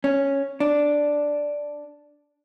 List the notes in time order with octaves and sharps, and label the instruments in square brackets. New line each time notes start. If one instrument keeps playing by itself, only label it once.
[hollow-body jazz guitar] C#4
D4